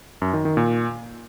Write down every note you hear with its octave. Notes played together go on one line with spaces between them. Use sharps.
F#2
D#3
D#3
A#2